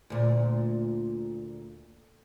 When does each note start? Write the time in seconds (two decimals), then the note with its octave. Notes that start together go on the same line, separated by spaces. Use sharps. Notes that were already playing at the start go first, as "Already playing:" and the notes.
0.10 D2 A#2